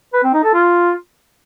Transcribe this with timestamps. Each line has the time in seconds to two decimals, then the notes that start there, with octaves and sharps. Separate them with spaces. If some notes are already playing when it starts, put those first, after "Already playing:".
0.13 B4
0.24 C4
0.34 D#4
0.44 A4
0.54 F4